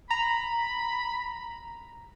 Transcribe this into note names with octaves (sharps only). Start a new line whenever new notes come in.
A#5 B5